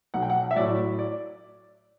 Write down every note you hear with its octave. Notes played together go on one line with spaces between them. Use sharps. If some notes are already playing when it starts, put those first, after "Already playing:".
B1 F#5
G5
F#5
E5
A2 F#3 D5
D5